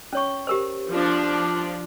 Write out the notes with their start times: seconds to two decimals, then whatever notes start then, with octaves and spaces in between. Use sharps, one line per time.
0.13 C#4 C#5 C#6
0.47 G4 A#4 C5
0.89 F3 D4